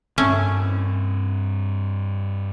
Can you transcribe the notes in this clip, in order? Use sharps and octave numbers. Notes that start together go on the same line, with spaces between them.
G2 A3 C4 C#4